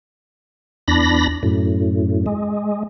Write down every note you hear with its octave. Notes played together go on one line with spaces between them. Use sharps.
E2 D4 B5 A#6
F#2 A2
G#3